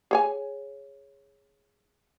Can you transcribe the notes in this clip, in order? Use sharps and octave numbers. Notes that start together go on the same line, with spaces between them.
G#4 C#5 G#5